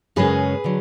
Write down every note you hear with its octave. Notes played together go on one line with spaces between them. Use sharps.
F#2 C#3 G#3 C#4 G#4 B4
D3 F#3